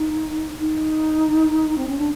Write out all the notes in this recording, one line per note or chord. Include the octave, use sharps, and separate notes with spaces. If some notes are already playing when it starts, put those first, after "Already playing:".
Already playing: D#4
D#4
C4
C#4
D4